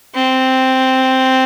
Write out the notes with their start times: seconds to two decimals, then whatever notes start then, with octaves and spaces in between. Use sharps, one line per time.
0.15 C4